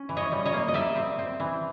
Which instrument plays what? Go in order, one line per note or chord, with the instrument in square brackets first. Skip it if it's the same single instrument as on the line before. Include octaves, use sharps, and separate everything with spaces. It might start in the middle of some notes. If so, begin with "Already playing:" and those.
Already playing: [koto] C#4
E3
C#5 D#5
G3
C#5 D#5
A#3
D#5
G3 D5 E5
C4
C4
E3